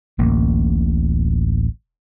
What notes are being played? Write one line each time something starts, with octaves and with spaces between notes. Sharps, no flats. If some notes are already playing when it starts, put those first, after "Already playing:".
D1 A1 A#3